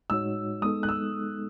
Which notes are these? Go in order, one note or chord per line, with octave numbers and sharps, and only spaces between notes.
A2 G#3 D#4 F#4 C#5 E6
G#3 B3 D#4 A4 D#6
F#6
E6